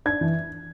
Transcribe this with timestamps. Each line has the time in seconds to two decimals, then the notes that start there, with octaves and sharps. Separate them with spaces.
0.06 D4 G#6
0.21 E3